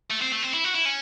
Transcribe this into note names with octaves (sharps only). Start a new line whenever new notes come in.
A3
C4
A3
C4
E4
F#4
E4
C#4